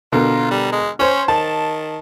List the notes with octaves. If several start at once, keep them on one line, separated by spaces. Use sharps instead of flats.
B2 D3 F4 A#4
G3
G#3
C#4 C5 C#5
D#3 A5